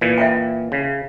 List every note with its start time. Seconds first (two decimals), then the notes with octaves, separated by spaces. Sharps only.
0.01 A#2 E3
0.18 E5 F5 G5
0.72 C#3